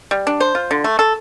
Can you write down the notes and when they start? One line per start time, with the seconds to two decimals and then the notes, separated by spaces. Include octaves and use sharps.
0.11 G3
0.27 D4
0.40 C5
0.55 F4
0.71 D3
0.84 A3
0.99 A4